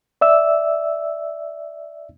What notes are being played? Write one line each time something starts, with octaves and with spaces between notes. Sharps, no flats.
D5 E5 E6